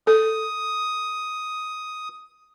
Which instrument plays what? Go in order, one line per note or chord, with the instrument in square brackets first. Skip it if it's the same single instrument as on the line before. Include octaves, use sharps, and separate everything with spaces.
[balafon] A4 [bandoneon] D#6